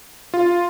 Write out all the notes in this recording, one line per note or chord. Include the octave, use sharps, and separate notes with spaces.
F4